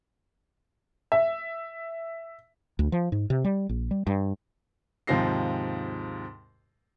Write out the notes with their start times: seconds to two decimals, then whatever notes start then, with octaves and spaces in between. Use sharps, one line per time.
1.12 E5
2.79 D2
2.92 F3
3.12 G#2
3.30 C3
3.44 G3
3.69 A#1
3.91 G3
4.07 G2
5.07 D#2 G#2 C3 F3 A#6 C7